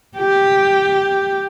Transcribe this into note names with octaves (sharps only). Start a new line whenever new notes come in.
G4